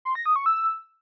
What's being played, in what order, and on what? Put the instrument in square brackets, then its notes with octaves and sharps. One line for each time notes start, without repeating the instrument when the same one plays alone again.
[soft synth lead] C6
A#6
D#6
C#6
E6